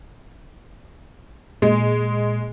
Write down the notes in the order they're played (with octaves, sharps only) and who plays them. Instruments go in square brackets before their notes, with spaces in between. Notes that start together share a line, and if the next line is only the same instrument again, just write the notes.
[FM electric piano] A#2 [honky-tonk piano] G#3